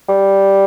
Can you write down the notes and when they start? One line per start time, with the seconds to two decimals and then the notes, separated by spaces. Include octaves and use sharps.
0.09 G3